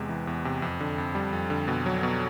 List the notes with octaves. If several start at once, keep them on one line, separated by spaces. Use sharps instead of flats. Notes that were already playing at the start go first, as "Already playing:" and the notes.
Already playing: E2 C3 G#3
E3
E2
C3
F2
D3
F2
G3
F2
D3
B2
F#3
B2